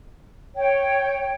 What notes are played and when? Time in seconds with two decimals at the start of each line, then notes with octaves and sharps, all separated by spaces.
0.56 C#5 G5